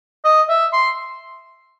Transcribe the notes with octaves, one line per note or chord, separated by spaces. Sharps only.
D#5
E5
C6